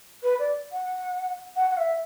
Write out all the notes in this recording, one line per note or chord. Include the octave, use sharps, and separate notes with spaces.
B4
D5
F#5
F#5
F#5
E5